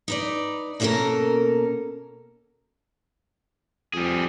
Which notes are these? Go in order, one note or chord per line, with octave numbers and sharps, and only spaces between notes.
D#4 B4 D5
B2 A#3 C#4 D#4 A4 A#4
F2 G3 G#4